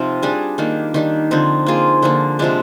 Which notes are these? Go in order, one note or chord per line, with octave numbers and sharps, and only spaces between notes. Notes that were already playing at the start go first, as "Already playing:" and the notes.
Already playing: C3 F3 C4 D#4 F4
G3 D4 G#4
D#3 A#3 D4
D#3 G3 D4
D3 F3 C4 D#4
A#3 F4 G#4
D3 F3 A#3
C3 F3 G#3 D4